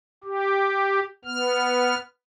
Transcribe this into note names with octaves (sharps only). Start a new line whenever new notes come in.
G4
B3 F6